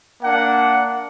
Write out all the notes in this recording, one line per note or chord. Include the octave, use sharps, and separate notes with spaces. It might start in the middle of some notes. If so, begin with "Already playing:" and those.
A#3 D4 F#5